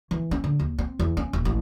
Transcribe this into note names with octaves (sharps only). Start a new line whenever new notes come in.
E3
C#4
D3
D#2
C4
E2
C#4
D#1
A1